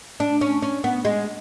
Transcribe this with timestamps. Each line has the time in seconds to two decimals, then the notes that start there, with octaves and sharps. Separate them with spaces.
0.20 D4
0.41 C#4
0.62 C#4
0.84 B3
1.05 G#3